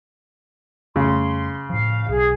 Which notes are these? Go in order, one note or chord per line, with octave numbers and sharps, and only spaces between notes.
F2 C#3 G3 A3 C6
A2 F3 F5
B1 G#4